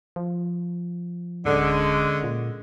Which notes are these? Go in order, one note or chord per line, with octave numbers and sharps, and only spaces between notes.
F3
D1 D3 G#3 C#4
A#2